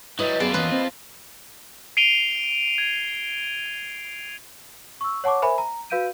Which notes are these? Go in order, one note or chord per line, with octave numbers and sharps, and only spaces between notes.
F#3 G3 E4 B4 D#5
F#2 B3 F4 G#4 A4 D5
E2 A#3 C#4 B4 D#5
C4
C7 D7 D#7 F7 G7
G#6
C#6 E6
C#5 F#5 A5 C#6 D6
A#4 C5 E5 G#5 B5
A#5
F#4 B4 F5 G6 D7 D#7